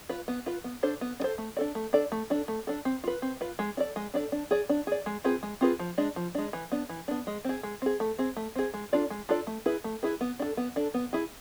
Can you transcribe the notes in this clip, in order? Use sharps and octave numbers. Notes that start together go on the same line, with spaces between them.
F4 B4
B3
F4 B4
B3
D4 A4 C5
B3
D4 A4 C5
A3
D4 A4 D5
A3
D4 A4 D5
A3
D4 A4
A3
D4 A4
C4
F4 B4
C4
F4 B4
G#3
D4 A4 D5
G#3
D4 A4 D5
D4
G#4 D5
D4
G#4 D5
G#3
C4 F4 G#4 B4
G#3
C4 F4 G#4 B4
F3
G#3 D4
F3
G#3 D4
E3
B3 D4
E3
B3 D4
G#3
C4 G#4
G#3
C4 G#4
A3
C4 G#4
A3
C4 G#4
G#3
D4 F4 A4 D5
G#3
D4 F4 A4 D5
A3
E4 G#4 B4
A3
E4 G#4 B4
B3
D4 A4
B3
D4 A4
B3
E4 G#4